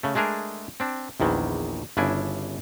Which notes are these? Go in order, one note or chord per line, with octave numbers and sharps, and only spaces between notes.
C#3 A3
G#3 A3 D4 G#4 A#4
C4 D4
A#1 E2 D#3 E3
G1 C#3 D4 E4 G#5